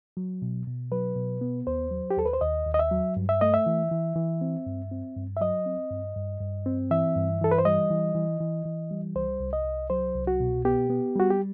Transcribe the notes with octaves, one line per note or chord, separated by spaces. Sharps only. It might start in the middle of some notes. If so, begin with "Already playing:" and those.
F#3
B2
B2
F#3 B4
B2
B3
D#2 C5
F#3
G4
D#2 A4
B4
C5
D#2 D#5
D#2
D#5
E5
F#3
G2
E5
A3 D#5
E5
E3
E3
E3
C4
G2
C4
G2
E5
F#3 D#5
C4
G2
G2
G2
C4
E3 E5
G2
E3 A4
B4
C5
G3 D#5
E3
E3
E3
E3
G3
C2 C5
C2
D#5
C2
F#3 C5
C2
F#4
B2
B3 G4
B3
G3 F#4
G4